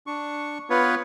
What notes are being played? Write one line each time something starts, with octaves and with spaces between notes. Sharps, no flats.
D4 C#6
B3 F4 B4 C#5